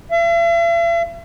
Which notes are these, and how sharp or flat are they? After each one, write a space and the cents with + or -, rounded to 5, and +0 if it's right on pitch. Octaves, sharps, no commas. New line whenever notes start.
E5 +45